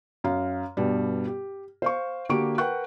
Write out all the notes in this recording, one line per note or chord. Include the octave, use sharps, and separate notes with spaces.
F#2 F5
G2 B2 G3
G4
C5 F5 C#6
D3 A#3 F#4 G4 C#6 D7
A#4 B4 F#5 G5 C#6 F#6